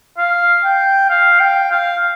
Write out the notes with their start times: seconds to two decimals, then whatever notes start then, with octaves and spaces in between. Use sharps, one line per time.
0.18 F5
0.64 G5
1.10 F5
1.40 G5
1.71 F5